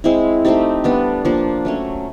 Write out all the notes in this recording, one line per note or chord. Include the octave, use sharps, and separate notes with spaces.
G#3 C4 E4
A3 C4 D#4 G4
G3 B3 D4
F3 A#3 D4
F#3 A3 C#4